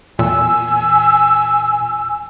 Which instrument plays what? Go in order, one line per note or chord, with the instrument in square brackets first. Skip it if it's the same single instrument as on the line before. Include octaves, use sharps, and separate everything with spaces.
[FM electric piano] E2 [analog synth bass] A#2 [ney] G#5 [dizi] E6